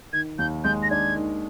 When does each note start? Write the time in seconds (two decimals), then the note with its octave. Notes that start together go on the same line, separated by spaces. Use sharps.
0.13 D#3 G#6
0.39 D#2 G6
0.64 G#3 G6
0.83 A#6
0.91 D4 G#6
1.16 D#3